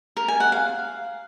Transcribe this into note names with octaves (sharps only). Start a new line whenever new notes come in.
A#4
G#5
F#5
F5